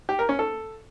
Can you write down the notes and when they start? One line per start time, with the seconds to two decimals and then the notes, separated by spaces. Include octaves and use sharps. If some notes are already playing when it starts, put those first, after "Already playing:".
0.09 G4
0.19 A#4
0.29 C#4
0.39 A4